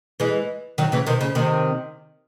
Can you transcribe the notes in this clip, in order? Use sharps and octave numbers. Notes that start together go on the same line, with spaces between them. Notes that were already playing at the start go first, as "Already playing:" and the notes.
E3 G#3
D#3 F#3
C#3 E3
C3 D#3
C#3
C3 D#3